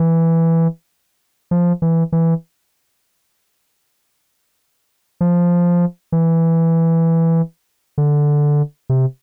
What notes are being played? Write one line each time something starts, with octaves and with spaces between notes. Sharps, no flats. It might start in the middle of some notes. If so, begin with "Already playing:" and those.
Already playing: E3
F3
E3
E3
F3
E3
D3
C3